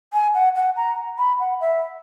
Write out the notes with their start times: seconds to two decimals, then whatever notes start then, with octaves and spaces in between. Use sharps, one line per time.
0.13 G#5
0.34 F#5
0.55 F#5
0.76 A#5
1.18 B5
1.39 F#5
1.60 E5